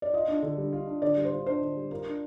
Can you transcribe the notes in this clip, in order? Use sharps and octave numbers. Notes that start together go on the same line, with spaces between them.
D5
F4 D#5
D4
D3
G3
F4
D4
D3 D5
G3
C5
F4
D4 C5
D3
G3
F4 A#4
D4